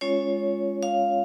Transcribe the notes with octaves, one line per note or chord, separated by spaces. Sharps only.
G#3 C#4 F4 C#5
F5